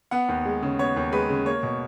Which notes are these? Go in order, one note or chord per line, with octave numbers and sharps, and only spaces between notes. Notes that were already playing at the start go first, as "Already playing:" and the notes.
B3 F#5
D#2
G#3
C#3
B3 C#5
D#2
G#3 B4
C#3
A#3 C#5
B2